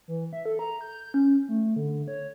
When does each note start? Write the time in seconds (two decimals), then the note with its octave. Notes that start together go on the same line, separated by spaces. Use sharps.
0.08 E3
0.33 E5
0.45 A4
0.59 A#5
0.81 G6
1.14 C#4
1.49 A3
1.76 D3
2.08 C#5